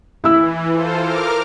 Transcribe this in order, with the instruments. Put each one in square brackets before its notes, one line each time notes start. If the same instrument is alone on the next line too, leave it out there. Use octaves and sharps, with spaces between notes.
[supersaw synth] E3 [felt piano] E4 E6
[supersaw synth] F4 A4 C5
A#4 D6 F6